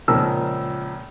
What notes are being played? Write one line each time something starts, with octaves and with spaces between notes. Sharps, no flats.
C#2 A#2 F3 A#4 E6